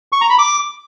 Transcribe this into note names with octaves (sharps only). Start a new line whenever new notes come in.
C#6
A#5
B5
D6